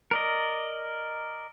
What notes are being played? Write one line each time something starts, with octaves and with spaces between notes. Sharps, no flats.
A#4 D5 D#5